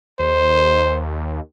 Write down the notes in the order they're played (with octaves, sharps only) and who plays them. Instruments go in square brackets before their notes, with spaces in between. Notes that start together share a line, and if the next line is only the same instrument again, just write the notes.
[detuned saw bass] D#2 [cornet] C5